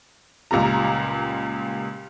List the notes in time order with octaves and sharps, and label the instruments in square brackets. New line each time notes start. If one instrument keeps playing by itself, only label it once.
[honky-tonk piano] C#2 A#2 G3 A#5